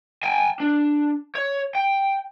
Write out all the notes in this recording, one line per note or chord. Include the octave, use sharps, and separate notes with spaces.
G5 G#5
D4
C#5
G5